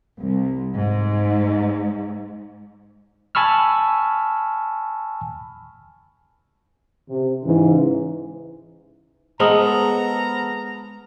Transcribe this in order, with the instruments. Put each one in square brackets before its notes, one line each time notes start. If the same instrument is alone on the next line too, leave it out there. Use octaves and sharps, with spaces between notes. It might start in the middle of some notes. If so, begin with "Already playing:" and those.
[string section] C2
G#2
[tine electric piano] G#5 A5 B5 C#6 E6 F6
[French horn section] C3
G#2 C#3 E3
[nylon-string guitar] G#3 [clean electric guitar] B3 A4 A#4 [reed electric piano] C5 D#6 [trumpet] A#5